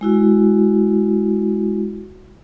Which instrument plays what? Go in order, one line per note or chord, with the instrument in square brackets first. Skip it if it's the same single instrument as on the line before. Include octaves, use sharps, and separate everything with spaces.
[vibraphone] G#3 E4 F#4